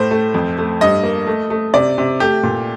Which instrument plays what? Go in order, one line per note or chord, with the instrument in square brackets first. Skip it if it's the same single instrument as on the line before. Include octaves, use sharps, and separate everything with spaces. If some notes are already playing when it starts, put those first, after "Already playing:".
Already playing: [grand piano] A2 A3 C5
A3
F2
A3
G2 D#5
A#3
A3
A3
C3 D5
C3
A3 G4
A#2